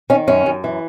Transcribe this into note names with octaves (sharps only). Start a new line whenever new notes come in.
D#3 C#4
F#2 C#4
F#2
E3